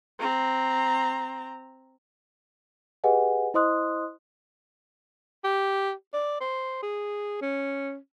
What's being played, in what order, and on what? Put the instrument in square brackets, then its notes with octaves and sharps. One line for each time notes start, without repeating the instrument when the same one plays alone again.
[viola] C4 A#5
[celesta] G4 G#4 B4 D#5 F#5 G#5
E4 C5 D#5 C6 D#6 F#6
[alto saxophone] G4
D5
C5
G#4
C#4